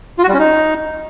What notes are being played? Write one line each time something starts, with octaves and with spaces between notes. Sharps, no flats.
F4
F#4
G3
C#4
D#4